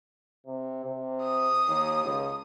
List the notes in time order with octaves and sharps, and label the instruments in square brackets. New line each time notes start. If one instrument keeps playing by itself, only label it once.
[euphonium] C3
C3
[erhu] D#6
[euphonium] D#2
C#2